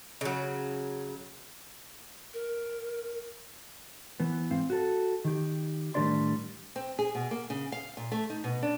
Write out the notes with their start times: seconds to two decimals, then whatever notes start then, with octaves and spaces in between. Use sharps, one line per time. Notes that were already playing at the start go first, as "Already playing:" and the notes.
0.21 C#3 F#3
2.34 A#4
4.20 E3 B3
4.51 G#2 C4 F5
4.70 F#4 A4
5.25 D#3 G4
5.94 A2 D#3 G3 D4 D5 C6
6.76 C4
6.99 G#4
7.15 B2
7.31 A#3
7.50 C#3
7.72 F5
7.97 A#2
8.12 A3
8.30 D#4
8.44 B2
8.63 D4